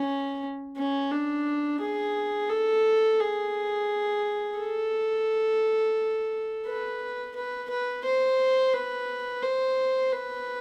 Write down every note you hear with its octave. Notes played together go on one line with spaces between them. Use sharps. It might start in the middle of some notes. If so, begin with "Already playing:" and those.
Already playing: C#4
C#4
D4
G#4
A4
G#4
A4
B4
B4
B4
C5
B4
C5
B4